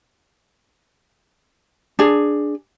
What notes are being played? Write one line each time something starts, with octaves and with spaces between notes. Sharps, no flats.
D4 G#4